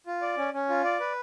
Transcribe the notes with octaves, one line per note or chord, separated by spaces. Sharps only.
F4
D5
C#4
C#4
F4
D5
B4